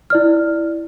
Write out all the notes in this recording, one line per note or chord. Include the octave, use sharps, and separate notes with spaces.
E4 D5 F6